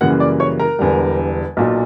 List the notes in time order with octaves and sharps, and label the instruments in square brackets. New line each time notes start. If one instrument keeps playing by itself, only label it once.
[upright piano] F#2 C#3 E3 G3 A#3 F#5 F#6
D5 D6
C#5 C#6
A#4 A#5
E1 E2 D3 G3
B1 A#2 F#3